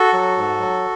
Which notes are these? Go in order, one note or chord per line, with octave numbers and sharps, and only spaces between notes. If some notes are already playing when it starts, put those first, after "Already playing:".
Already playing: F#4 A4
F#3
G#2
F#3